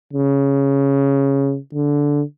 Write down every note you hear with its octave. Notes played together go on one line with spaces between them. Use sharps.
C#3
D3